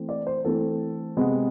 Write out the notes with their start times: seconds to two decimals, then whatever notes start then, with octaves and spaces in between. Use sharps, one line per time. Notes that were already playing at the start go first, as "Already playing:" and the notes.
Already playing: E3 A3 C4
0.09 D5
0.27 C5
0.45 E3 A3 C4 A4
1.17 C3 G#3 B3